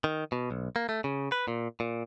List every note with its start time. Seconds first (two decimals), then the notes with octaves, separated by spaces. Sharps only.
0.04 D#3
0.32 B2
0.51 B1
0.76 A#3
0.89 A3
1.04 C#3
1.32 B4
1.48 A#2
1.80 A#2